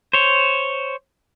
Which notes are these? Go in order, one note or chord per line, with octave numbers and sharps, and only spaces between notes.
C5 C#5